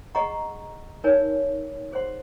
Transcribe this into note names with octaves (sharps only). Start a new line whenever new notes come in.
G#4 D#5 F#5 A#5 C#6
D#4 A#4 C#5 G#5
G#4 C5 F#5 C6